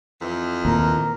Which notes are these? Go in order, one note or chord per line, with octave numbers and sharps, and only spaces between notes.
F2 E3
D#2 A#2 A#4